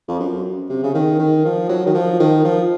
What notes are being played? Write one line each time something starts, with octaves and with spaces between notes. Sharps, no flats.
F2
F#2
C3
C#3
D#3
D#3
F3
F#3
D#3
F3
D#3
F3